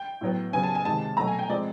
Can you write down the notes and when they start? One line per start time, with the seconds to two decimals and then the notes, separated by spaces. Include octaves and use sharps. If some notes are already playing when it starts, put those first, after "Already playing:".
Already playing: G5
0.21 A2 F#3 B3
0.53 C#3 F#3 B3 G#5
0.63 A5
0.75 G#5
0.85 C3 D#3 G#3 A5
1.17 B2 F#3 A3 A#5
1.28 G#5
1.39 G5
1.49 F3 G#3 C4 D5